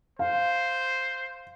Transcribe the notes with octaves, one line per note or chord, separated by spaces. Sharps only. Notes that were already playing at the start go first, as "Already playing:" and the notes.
C5 F5